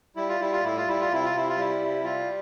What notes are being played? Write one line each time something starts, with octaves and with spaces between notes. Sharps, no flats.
G3 E4
F4
G3 E4
F4
A2 E4
F4
G3 E4
F4
C3 E4
F4
C3 E4
F4
G3 E4
C3
G3 F4